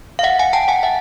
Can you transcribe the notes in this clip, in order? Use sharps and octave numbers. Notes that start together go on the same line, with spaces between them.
F5
E5 F#5
F#5 G#5
G5 A5
F#5 G#5
E5 F#5